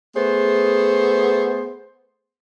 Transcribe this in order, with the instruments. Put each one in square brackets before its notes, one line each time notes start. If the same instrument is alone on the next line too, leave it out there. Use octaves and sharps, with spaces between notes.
[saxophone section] A3 B3 G#4 C5